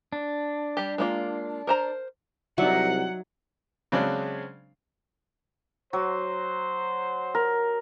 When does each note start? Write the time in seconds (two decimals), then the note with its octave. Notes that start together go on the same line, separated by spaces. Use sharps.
0.12 D4
0.77 G3 G4
0.98 G#3 A#3 F4
1.67 A#4 C5 A#5
2.58 C2 F#3 D#4 D5 E5 F#5
3.92 C#3 F#3 G#3 C4 D4
5.93 F#3 C5
7.35 A#4